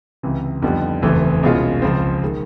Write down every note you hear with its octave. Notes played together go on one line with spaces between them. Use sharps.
C#2 C3 E3
F2 D3 G3 B3 D#4
F#1 E2 C3 E3 A3
C2 B2 G#3 C#4 F4
C#2 C#3 F3 G#3 C4
D#3 G#3